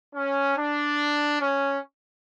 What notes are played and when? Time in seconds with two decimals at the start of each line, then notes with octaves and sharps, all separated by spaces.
0.15 C#4
0.57 D4
1.40 C#4